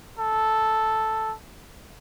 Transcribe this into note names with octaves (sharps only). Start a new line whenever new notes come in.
A4